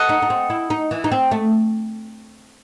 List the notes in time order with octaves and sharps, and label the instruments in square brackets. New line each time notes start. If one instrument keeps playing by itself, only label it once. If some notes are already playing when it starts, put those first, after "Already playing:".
Already playing: [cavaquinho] A4 D#5 F#5
[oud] D#4
D#4
C4
E4
D#4
E3
D#4
C4
A3